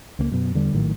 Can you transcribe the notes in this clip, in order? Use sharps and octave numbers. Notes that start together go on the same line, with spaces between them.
C#2 G#3 A#3
F#2 B2
E2 D3 G3
A#1 A2 D#3 F#3